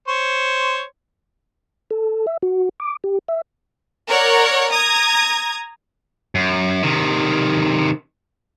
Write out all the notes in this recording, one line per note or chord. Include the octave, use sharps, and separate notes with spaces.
C5 C#5 C#6
A4
E5
F#4
D6
G4
E5
A#4 C#5 D5 F#5
A#5 D#6 G#6
F#2
C3 D#3